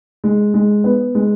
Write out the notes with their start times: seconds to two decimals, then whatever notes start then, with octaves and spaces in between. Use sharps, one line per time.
0.24 G#3
0.54 G#3
0.84 B3
1.15 G#3